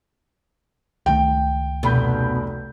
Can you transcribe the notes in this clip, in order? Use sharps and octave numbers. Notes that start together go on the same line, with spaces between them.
C#2 D#3 A3 G5
F1 B2 B5 G6